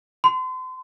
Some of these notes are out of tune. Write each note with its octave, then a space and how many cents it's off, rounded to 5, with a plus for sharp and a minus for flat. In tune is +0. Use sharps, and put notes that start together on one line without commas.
C6 -35